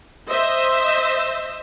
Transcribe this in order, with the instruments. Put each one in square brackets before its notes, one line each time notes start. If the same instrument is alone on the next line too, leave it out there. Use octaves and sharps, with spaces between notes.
[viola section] C5 D#5 E5